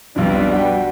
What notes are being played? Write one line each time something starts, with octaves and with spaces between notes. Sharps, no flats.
B1 F2 G3 D4 B4
F#4 G5